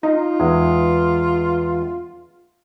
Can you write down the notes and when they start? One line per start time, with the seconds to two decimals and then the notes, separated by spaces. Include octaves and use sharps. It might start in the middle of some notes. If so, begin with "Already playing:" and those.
0.03 D#4 F4
0.40 E2 G#3